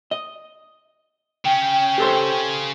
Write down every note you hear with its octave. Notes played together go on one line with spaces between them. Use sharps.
D#5
C#3 C#4 G5
G4 A4 C5